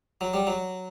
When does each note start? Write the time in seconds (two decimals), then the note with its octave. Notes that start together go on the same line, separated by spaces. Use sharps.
0.21 F#3
0.34 G3
0.47 F#3